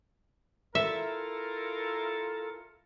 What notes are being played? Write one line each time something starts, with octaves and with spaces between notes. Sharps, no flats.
E4 F4 A4 A#4 E5